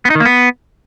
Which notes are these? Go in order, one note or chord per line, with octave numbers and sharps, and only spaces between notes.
B3
D#4
D#3
A#3
B3